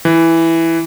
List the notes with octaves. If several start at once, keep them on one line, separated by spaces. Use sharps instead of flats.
E3